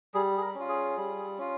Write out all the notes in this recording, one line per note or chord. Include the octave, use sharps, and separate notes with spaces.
G3 G#4
G#4
A#4
C#4 F4
G#4
G3
C#4 F4